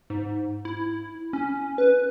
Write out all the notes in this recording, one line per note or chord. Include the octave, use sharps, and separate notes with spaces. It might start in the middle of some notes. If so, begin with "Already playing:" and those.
G#2
E4
C#4
B4